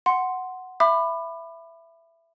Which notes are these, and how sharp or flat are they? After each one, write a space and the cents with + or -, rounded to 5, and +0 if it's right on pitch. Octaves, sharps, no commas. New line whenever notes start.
F#5 +0 C6 +0
E5 +10 B5 +10 D6 +35